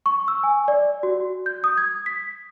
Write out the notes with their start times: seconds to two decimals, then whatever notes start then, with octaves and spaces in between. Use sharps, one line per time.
0.06 C#6
0.28 E6
0.43 G#5
0.68 D5
1.03 F#4
1.46 G6
1.64 D#6
1.78 G#6
2.06 B6